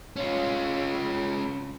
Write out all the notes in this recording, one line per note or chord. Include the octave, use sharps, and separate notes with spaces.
C#4 F4